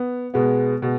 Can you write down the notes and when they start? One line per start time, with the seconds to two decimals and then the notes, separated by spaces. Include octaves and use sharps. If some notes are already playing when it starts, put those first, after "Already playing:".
Already playing: B3
0.34 B2 G#3 B3
0.82 B2 G#3